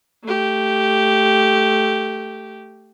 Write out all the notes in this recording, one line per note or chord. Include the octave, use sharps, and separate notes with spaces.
A3 G4